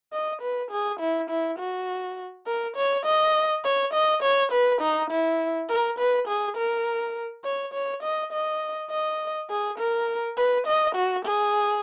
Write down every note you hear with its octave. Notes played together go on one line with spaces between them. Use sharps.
D#5
B4
G#4
E4
E4
F#4
A#4
C#5
D#5
C#5
D#5
C#5
B4
D#4
E4
A#4
B4
G#4
A#4
C#5
C#5
D#5
D#5
D#5
G#4
A#4
B4
D#5
F#4
G#4